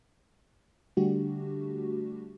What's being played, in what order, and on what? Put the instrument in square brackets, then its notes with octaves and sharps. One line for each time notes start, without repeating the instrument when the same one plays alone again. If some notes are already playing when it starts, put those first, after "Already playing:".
[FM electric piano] D3 G3 A3 D4 F#4 G4